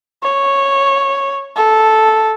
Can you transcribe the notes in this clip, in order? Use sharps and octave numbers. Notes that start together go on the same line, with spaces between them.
C#5
A4